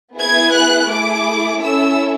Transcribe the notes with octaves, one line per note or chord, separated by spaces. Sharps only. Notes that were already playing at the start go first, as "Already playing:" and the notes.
B3 E4 G#4 G#6
F#6
A3 E4 G#4 D6
C#4 E4 A4 E6